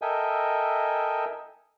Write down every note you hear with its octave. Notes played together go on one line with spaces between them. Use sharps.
A4 A#4 D#5 E5 G5 G#5